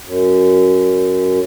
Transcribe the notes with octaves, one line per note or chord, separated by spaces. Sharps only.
F#2